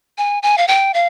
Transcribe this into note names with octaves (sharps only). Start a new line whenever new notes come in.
G#5
G#5
F5
G5
F5